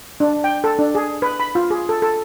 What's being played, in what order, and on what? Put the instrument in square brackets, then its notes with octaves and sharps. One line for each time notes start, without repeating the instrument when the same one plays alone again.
[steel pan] D4
G5
A4
D4
G#4
B4
B5
F4
G#4
A4
A4